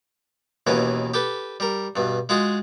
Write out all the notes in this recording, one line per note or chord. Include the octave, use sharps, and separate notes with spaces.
D#2 B2 E3 A#3 C#4
G4 A4 B4
G3 A#4
G2 B2
G#3 F4 F#4 G#4